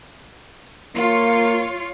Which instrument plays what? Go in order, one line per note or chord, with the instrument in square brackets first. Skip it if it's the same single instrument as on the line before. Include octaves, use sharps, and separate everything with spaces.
[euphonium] A#3 [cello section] F4 C#5